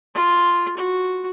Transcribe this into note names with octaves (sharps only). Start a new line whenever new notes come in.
F4
F#4